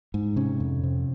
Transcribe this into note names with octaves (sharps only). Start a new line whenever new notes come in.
G#2
C3 C#4
F2
C3